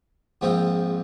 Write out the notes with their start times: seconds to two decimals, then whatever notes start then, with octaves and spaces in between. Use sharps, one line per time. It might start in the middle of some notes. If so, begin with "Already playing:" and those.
0.41 A#1 G#2 F3 C4 F4